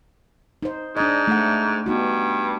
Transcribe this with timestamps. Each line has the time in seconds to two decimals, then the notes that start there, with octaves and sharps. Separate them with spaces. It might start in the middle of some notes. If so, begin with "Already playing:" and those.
0.63 D#4 C5
0.97 G#2 D4 D#5
1.28 A3 F#5
1.86 G2 B3 D#4 F#4